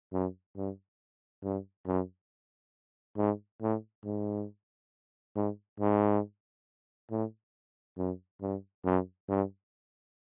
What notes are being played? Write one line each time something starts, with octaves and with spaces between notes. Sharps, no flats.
F#2
G2
G2
F#2
G#2
A2
G#2
G#2
G#2
A2
F#2
G2
F#2
G2